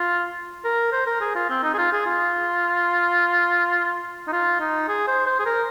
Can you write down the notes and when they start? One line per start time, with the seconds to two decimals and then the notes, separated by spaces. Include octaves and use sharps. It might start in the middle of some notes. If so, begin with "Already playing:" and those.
Already playing: F4
0.64 A#4
0.92 C5
1.06 A#4
1.21 G#4
1.35 F4
1.50 C4
1.63 D#4
1.74 G#4
1.78 F4
1.92 G#4
2.06 F4
4.27 D#4
4.32 F4
4.60 D#4
4.88 G#4
5.07 C5
5.26 C5
5.39 G#4
5.46 A#4